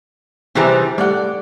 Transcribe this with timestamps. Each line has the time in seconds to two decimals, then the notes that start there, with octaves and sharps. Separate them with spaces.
0.55 C3 E3 G3 C4 G#4 A#5
0.98 G3 A3 D5 F#5